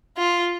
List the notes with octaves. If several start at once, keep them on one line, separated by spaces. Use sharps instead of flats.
F4